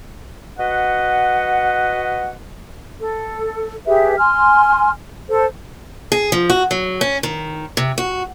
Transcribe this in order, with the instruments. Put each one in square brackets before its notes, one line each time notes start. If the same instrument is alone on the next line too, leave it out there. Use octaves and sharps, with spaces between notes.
[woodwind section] F#4 B4 D#5 F#5
[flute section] A4
G4 G#4 B4 E5
G#5 C6 F6
A4 C5
[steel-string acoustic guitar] G#4
F3
F#4
F#3
C#4
D#3
C3
F#4